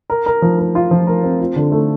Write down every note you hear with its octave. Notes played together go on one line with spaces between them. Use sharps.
A#4
A#4
F3
A#4
F4
F3
A#4
C4
F4
D3
A3